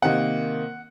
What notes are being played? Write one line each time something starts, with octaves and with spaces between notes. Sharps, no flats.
C3 D#3 A#3 F#5